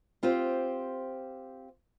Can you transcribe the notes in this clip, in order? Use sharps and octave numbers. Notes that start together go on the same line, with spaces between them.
C4 F4 G4 C5